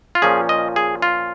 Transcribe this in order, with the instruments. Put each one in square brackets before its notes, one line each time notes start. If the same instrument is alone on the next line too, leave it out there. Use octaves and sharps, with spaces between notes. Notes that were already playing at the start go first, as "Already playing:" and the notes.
[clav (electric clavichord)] F4
A#2 F3 C#4 G#4
D#5
G#4
F4